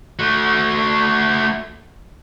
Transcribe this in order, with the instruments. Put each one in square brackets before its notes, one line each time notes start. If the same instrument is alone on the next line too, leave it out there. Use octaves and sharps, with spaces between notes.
[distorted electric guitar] A3 F#4